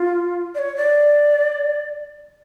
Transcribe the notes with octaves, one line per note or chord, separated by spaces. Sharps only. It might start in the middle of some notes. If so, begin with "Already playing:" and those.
Already playing: F4
D5
C#5
D5